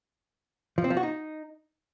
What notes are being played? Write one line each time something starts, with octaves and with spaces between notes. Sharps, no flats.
F3
C4
F3
F#4
D#4